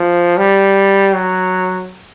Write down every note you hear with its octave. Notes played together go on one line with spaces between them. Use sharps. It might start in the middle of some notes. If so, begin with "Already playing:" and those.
Already playing: F3
G3
F#3